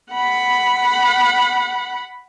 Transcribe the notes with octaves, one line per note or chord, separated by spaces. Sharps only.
F#5 B5